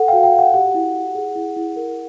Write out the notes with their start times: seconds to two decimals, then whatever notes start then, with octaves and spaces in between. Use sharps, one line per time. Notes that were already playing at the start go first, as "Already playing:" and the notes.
Already playing: A4 F#5
0.08 F#4 F5 G5
0.23 F5 G5
0.33 F#4
0.39 F#5
0.54 G4 F#5
0.74 E4
0.94 E4
1.15 G#4
1.35 E4
1.56 E4
1.76 A#4